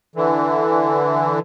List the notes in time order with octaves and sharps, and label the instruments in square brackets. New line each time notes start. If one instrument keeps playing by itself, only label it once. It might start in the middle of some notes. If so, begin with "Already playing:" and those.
[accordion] D3 E3